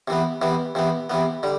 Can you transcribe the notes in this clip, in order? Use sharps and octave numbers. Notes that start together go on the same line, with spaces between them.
C3 E3 B3
C3 E3 B3
C3 E3 B3
C3 E3 B3
D3 G3